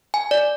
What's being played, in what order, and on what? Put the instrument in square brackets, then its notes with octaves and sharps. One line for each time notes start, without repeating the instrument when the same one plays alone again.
[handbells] G#5
D5